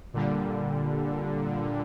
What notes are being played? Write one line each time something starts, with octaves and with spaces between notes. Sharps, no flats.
A#2 D3 G3